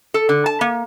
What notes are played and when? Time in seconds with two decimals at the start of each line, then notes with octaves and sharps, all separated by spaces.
0.14 A4
0.29 D3
0.46 A5
0.61 A#3